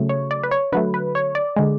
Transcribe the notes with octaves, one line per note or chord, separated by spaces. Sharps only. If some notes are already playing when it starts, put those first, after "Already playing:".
Already playing: C#3 F#3 A3
C#5
D5
B4
C#5
D3 F#3 A3 B4
B4
C#5
D5
D3 G#3